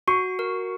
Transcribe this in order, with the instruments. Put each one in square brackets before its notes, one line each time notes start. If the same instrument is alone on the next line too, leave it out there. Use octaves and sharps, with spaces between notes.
[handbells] F#4 [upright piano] C#6
[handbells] A#4